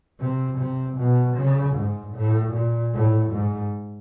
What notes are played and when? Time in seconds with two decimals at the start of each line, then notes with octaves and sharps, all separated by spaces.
0.20 C3
0.59 C3
0.98 B2
1.37 C#3
1.76 G#2
2.15 A2
2.54 A#2
2.94 A2
3.32 G#2